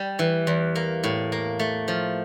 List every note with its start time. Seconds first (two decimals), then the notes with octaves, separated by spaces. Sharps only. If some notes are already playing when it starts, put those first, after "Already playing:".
Already playing: G3
0.19 E3
0.47 E2
0.76 A#3
1.03 A2
1.32 A#3
1.59 A3
1.88 F3